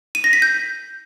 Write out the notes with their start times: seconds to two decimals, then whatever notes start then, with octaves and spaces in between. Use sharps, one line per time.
0.15 D#7
0.24 A#6
0.33 B6
0.42 G6